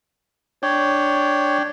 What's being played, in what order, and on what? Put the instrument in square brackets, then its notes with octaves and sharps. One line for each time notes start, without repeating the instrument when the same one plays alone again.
[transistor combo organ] D4 G5 [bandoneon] C#5